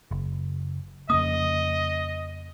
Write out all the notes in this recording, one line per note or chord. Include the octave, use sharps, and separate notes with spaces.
F#1
F2 C#3 A#3 D#5 D#6